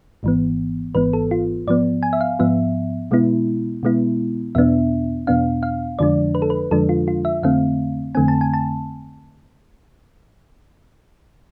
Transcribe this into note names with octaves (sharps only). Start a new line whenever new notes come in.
G#1 G#2 E3 B3
G#1 G#2 E3 B3 B4
A4
F4
G#2 F3 B3 D5
G#5
E5
F5
G#2 F3 B3 E5
B2 G#3 B3 E4
B2 G#3 B3 E4
E2 B2 B3 D4 E5
E2 B2 B3 D4 F5
F5
F2 D3 F3 G#3 D4 D5
B4
A4
B4
F2 D3 F3 G#3 D4 A4
F4
F4
E5
F2 D3 A3 C4 F5
F2 D3 A3 C4 G#5
A5
G#5
A5